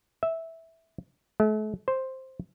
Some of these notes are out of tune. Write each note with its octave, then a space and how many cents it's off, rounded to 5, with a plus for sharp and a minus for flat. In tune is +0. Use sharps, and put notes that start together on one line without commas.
E5 -10
A3 -40
C5 +5